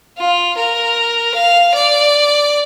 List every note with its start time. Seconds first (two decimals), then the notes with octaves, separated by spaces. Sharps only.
0.18 F4
0.57 A#4
1.35 F5
1.74 D5